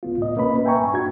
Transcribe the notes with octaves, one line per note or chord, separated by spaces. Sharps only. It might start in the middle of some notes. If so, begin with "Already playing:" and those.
C#2 B3 F4
A2 D#5
C2 A#2 A#3 C#4 B4 B5
E5 G5 G#5 A#5 C#6
G2
D4 F#4 G#6